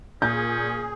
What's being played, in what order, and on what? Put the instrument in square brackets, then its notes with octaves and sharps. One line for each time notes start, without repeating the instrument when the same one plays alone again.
[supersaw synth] A#2 [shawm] C#4 [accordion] G#4 [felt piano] G6